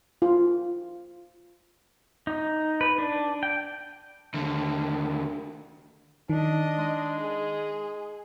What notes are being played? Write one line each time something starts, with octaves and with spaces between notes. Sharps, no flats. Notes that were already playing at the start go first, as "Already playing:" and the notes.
F4
D#4
B4
D4
G5
D#2 D3
D#3 D4 D#5
G#3
G#4